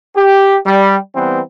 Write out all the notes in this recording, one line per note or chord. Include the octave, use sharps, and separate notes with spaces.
G4
G3
E3 G3 B3 C4